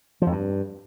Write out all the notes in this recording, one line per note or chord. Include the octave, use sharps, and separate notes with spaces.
F3
F2
G2